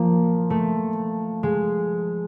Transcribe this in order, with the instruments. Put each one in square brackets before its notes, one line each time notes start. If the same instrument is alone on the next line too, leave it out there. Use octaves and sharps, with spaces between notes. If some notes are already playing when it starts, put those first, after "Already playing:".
Already playing: [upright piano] F3 [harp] A#3
[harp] A3
G#3